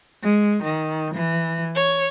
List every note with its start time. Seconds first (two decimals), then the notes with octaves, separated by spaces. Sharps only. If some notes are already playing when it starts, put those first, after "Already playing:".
0.22 G#3
0.62 D#3
1.15 E3
1.75 C#5